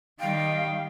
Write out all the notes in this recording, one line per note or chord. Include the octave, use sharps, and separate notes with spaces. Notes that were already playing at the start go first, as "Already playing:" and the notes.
D#3 G3 F5 G5